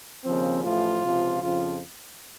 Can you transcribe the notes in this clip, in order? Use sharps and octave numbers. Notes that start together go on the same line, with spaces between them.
D#2 C#3 F3 C4
A1 A2 F3 F4
C#2 C3 F3
F2 C#3 F3 F4